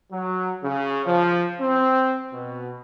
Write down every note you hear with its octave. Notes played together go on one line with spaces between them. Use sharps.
F#3
C#3
F3
C4
B2